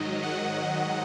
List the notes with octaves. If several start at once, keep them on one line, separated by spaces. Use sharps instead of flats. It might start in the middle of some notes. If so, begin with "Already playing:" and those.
Already playing: G#2 D#3 F#3 D#5
F#5